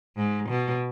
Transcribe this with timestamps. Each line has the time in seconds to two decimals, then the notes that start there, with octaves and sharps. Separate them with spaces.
0.17 G#2
0.49 B2